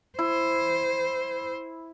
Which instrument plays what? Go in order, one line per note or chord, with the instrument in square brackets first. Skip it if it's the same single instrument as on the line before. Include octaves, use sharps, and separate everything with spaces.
[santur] E4 [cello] C5